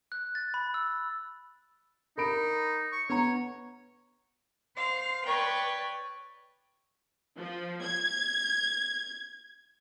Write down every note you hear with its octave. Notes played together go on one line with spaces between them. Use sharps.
F#6
A6
B5
E6
D#4 A#4 B5 D7
C#6
B3 C#5 A#5
C5 F5
B4 C#5 D5 G5
F3
G#6